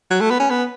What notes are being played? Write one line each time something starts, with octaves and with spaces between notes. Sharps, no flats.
F#3
A3
B3
C#4
B3